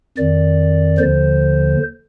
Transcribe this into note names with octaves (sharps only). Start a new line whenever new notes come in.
F2 D#3 D5
D#2 D3 F3 C5